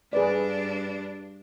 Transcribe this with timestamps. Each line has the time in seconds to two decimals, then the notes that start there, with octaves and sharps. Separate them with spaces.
0.13 G2 D4 G#4 B4 D5